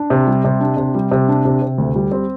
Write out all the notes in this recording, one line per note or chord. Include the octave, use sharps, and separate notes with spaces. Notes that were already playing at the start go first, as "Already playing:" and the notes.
Already playing: D4
C3
G3
C3
D4
C3
G3
C3
D4
C3
C3
D2
G3
C4